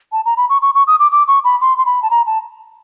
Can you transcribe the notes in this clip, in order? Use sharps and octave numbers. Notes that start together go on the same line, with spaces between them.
A5
A#5
B5
C#6
C#6
C#6
D#6
D6
D6
C#6
B5
C6
C6
B5
A5
A#5
A5